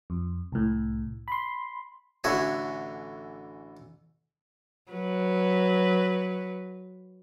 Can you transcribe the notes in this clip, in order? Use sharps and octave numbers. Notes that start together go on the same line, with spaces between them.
F2
C2 A2
B5 C6
A1 D3 E3 F#4 E5 G#5
F#3 B4